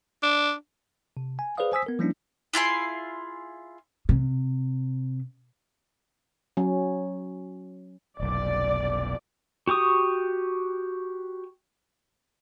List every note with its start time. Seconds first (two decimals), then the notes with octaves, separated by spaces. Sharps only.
0.23 D4
1.17 C3
1.39 G#5
1.57 G#4 B4 C5 D5 F5 D#6
1.72 C5 G#5 D#6 E6 B6
1.86 B3 A#4
1.99 F3 G3 A#3 C#4 D4 E4
2.53 E4 F4 G#4 C6
4.09 C3
6.57 F#3 C#4
8.20 F1 B1 D5
9.67 F#4 G4 C#6 D#6